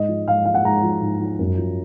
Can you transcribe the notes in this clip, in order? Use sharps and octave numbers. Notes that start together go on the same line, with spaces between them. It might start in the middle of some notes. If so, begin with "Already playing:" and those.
Already playing: G#2 D#5
F3
G#2 F5
F3 F5
F#5
G#2 A#5
F3
G#2
F3
F#2
F3